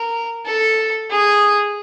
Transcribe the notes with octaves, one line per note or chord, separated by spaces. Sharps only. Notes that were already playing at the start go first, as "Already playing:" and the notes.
Already playing: A#4
A4
G#4